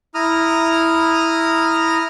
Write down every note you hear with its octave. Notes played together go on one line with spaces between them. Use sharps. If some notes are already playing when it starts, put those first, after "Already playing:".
E4 A#5 D#6 F6